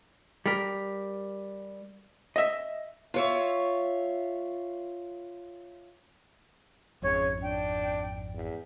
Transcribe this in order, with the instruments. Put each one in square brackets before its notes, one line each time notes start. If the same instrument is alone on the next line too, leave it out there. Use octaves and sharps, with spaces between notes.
[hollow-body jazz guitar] G3 A#4
D#5 E5
[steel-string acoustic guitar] F4 C#5 E5
[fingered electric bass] G#1 F2 [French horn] C#3 [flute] C#5
[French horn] D4 [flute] G5
[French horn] E2